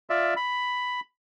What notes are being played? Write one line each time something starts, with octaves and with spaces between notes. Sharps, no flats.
F4 D5 E5
B5